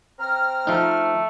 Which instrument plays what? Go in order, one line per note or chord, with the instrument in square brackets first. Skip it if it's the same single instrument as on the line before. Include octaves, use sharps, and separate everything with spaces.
[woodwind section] C4 A#5 F6
[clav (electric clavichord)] F3 D#4 [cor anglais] A3